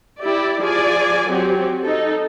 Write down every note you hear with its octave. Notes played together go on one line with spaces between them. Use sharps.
E4 G4 D5
F3 G#4 D5 G#5
F#3 C4 F#4 G4
D#4 A4